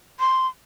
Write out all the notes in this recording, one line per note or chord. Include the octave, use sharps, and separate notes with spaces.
C6